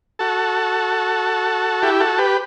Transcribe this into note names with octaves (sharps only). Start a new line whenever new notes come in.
F#4 A4
E4 G4
F#4 A4
G4 B4